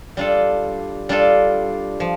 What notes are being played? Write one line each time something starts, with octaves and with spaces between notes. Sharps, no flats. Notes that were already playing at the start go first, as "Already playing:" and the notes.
G3 D4 F4 A4
G3 D4 F4 A4
F3